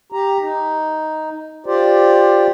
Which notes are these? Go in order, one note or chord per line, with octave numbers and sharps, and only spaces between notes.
G4 A#5
D#4
F4 G4 C5 D5